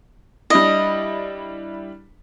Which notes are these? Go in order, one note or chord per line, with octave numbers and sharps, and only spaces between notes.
G3 D4 E4 D#5